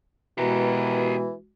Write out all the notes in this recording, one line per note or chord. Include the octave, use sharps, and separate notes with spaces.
B2 E3 G#3 F#4 G4 A#4